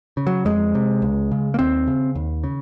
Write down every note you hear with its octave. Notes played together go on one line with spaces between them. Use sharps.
C#3
F#3
F2 G#3
C3
C#2
C#3
A#3
D#2 C4
C#3
D#2
C#3